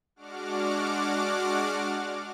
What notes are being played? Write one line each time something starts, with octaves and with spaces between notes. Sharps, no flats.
G#3 D4 F#4 F#5 D6 F6